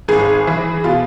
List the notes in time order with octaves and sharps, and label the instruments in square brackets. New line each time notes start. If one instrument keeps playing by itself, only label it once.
[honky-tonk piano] G#1 G#4
E3
B2 F4